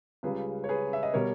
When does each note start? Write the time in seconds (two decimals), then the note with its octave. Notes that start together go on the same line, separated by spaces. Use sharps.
0.23 C#2 C#3 G3 G#4 B4
0.64 C#5
0.69 G#4 B4
0.93 E5
1.03 D#5
1.14 B2 G3 A#4 C#5